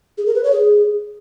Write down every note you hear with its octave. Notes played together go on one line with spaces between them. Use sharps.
G#4
A#4
B4
C#5
G#4